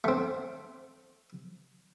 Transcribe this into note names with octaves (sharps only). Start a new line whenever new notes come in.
A3 C4